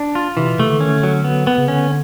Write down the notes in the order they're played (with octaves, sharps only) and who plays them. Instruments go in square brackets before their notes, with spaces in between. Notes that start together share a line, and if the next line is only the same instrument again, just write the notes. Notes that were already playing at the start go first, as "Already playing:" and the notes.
Already playing: [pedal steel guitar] D4
F4
[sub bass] C3 [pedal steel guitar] E3
[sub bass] B2
[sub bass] C3 [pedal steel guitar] A3
[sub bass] D3
[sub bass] D#3 [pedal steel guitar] C#4
[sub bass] D3
[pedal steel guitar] F#3
B3
B3
[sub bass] C#3
[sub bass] D3 [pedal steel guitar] C#4